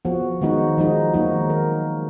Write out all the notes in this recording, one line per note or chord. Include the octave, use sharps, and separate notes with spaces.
F3 B3 F#4
D#3 G#3 B3 D#4 F#4
F3 G#3 D#4
D#3 F#3 A#3 D#4 F#4
A#4